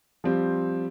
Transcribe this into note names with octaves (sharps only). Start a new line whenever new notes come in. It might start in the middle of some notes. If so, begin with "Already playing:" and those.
F3 G3 C4 G4